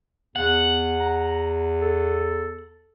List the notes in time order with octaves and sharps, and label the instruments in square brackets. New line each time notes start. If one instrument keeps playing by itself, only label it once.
[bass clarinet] E2 [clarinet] B3 [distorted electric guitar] F#5
[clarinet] A#5
A4